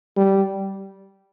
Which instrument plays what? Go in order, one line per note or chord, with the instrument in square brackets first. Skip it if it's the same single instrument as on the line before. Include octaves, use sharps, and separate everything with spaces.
[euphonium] G3